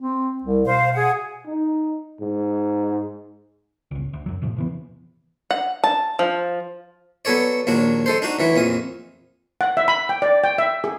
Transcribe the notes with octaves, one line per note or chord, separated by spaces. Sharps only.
C4
C2
B2 C5 F5
G#4 F#5
D#4
G#2
G1 C#2
D2
F#2 F#3
E2 A2 C3 F3
C3 E3 B3
F#5
A5
F3
F#3 B3 A4 C#5 D5
A#1 D#2 F#3 D4
G#3 A4 C5
D4 D#4 F#4
D2 E3 F#3
A#1 F2 D#6
F#5
E5
B5
G5
D5
G5
E5
G#4